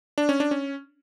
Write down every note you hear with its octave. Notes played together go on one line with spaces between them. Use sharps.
D4
C#4
D4
C#4